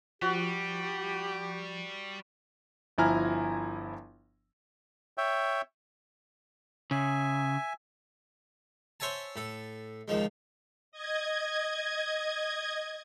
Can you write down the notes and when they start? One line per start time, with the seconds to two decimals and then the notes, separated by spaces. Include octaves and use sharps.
0.22 F3 G3 F#4 G4
2.98 G1 F3 E4 G#5 A#5 F6
5.18 C#5 E5 G5
6.91 C#3 E5 G#5
9.00 C5 C#5 E5 G#5 A5
9.36 A2 A4
10.08 C#2 D#3 F3 G#3
10.92 D#5 G#6